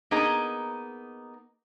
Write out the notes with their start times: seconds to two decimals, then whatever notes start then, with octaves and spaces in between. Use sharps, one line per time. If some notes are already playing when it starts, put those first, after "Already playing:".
0.11 A#3 B3 D#4 G#4